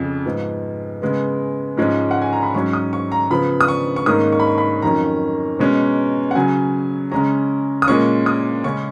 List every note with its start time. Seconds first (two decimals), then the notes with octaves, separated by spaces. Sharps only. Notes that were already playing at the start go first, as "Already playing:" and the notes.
Already playing: F2 C#3 F3
0.25 G#2 F3 B3
1.02 C#3 G#3 B3
1.77 G#2 F3 G#3 C#4
2.11 F#5
2.22 G#5
2.33 A#5
2.43 B5
2.54 G#2 F#3 C#4 C#6
2.73 D#6
2.93 C#6
3.12 A#5
3.30 C#3 F3 B3 B5
3.61 D#6
3.68 C#6
3.96 C#6
4.06 G#2 D#3 A#3 C#4 D#6
4.32 C#6
4.40 B5
4.47 C#6
4.58 B5
4.82 F2 D#3 F#3 C#4 A#5
5.59 B2 G#3 C#4
6.31 F#5
6.35 C#3 F#3 C#4 G#5
7.12 C#3 G#3 C#4 A#5
7.82 D#6
7.87 A#2 G#3 C#4 C#6
8.26 D#6
8.64 C#3 G#3 C#4 C#6